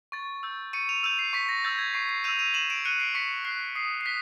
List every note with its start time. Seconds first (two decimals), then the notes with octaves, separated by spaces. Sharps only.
0.12 C#6 A6
0.43 E6 G6
0.73 C#6 C#7 D#7
0.89 D#7 F7
1.03 E6 G6 D#7 F7
1.19 C7
1.33 C#6 B6
1.49 A#6
1.64 E6 G6 A6
1.79 G#6
1.94 C#6 C7
2.09 C7
2.24 E6 G6 D#7 F7
2.39 D#7 F7
2.54 C#6 E7 F#7
2.70 D7 E7
2.85 F#6 C#7 D#7
2.99 C7 D7
3.15 C#6 B6 C#7
3.45 F#6 C7
3.75 D#6 C7
4.01 C7
4.06 F#6 B6